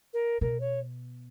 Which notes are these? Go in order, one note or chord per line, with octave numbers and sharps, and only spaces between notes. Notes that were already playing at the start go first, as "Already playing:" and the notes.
A#4
B2 A#4
C#5